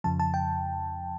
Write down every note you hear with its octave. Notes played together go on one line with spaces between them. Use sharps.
F2 C#3 F3 A5
A5
G5